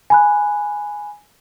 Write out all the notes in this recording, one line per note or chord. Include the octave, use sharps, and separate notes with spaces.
G#5 B5 F#6